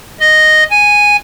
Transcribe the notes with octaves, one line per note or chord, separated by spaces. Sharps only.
D#5
G#5